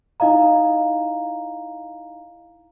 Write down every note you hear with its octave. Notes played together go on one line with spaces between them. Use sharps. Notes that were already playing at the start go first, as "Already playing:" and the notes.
D#4 E4 D#5 F5 A#5